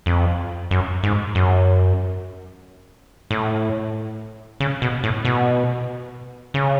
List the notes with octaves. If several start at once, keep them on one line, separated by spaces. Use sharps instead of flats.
F2
F#2
G#2
F#2
A2
C#3
B2
A2
B2
C#3